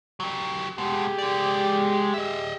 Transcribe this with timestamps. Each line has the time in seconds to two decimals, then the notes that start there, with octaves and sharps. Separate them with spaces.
0.20 F#3 G4
0.78 B2 G#3 G4 G#4
1.18 G#3 D5
2.14 D#5 E5